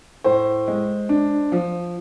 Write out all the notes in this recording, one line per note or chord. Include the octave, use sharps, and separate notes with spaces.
A2 C5
G#3
D4
F3